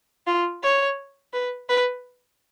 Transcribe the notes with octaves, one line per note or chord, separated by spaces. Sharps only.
F4
C#5
B4
B4